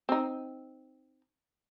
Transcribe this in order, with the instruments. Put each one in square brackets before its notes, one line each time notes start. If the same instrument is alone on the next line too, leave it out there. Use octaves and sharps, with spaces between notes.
[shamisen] C4 D#4